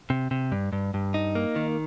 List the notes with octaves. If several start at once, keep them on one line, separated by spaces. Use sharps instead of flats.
C3
C3
G2
G2
G2
D#4
A#3
D#3